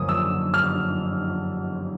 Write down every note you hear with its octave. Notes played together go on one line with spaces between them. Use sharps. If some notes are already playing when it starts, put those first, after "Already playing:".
Already playing: F#2 D3 F3 A#3 D4 D#6
E6
F6